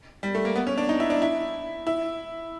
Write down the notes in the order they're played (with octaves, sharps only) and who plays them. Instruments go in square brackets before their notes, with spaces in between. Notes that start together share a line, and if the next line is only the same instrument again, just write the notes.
[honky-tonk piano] G3
A3
A#3
B3
C#4
D4
D#4
E4
D4
E4
E4